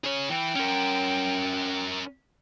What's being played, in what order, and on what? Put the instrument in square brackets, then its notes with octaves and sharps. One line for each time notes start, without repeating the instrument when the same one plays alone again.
[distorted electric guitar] G#4 C#5
[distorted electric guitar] E3 [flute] G5
[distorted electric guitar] C#4 A#4